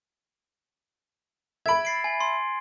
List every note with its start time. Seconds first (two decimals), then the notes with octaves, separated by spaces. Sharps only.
1.66 E5 B5 G#6 D7
1.85 A6 C7 D7
2.04 G#5
2.20 C6